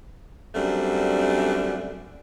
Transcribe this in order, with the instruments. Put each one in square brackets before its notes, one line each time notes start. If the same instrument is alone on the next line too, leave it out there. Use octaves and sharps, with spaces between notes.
[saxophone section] F#2 G3 A3 C4 D4